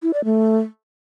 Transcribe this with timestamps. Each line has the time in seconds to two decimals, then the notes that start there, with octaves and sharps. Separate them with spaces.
0.03 E4
0.14 D5
0.25 A3